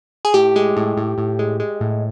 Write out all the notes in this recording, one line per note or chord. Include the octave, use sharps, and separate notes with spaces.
G#4
A2 G4
G#3
A2
A2
A2
G#3
G#3
A2